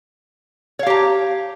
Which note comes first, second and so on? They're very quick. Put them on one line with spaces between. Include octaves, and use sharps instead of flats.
C#5 F5 G4 A#5